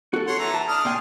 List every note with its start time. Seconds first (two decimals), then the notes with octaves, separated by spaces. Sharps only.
0.14 F#4 A4
0.27 C#5 F#5 C6
0.39 E3 A#5
0.55 A5
0.68 D4 D#6 F6
0.85 A#2 D4 G5 G#5 C6